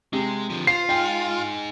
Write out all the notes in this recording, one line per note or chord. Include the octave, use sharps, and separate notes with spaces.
C3 G#3
D3 F3
F4 C5 C7
D#4 G#4 G5